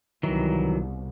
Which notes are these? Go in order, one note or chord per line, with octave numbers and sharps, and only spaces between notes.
C2 B2 D#3 E3 F#3